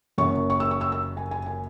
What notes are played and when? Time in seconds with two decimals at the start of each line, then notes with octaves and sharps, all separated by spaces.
0.18 F#1 F#2 F#3 C#6
0.50 C#6
0.60 E6
0.71 C#6
0.81 E6
0.92 E6
1.17 G#5
1.31 G#5
1.46 G#5